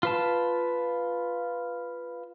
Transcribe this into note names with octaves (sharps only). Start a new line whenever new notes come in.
F4 B4 A5